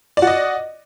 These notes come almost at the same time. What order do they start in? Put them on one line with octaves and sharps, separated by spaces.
D5 F#4 D#5